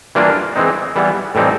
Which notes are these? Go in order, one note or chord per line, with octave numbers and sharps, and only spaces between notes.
E3 G3 A#3 D4 F4
E3 G#3 C4 D#4
E3 G3 B3
A2 E3 G3 C4 D#4